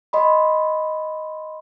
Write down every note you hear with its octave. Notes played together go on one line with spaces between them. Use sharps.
D#5 B5 C6